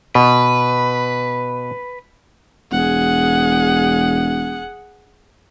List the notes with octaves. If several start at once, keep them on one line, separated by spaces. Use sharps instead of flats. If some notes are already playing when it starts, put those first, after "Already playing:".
B2 B4
E1 G#4 F#5